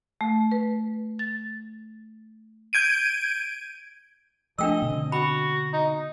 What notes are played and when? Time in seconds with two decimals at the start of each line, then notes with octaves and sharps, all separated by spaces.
0.21 A3
0.51 B4
1.19 A6
2.73 G6 G#6 D7 D#7
4.58 F3 A3 D4 D#5 G5 E6
4.82 B2 D3 C4
5.12 F#4 B5
5.73 D#4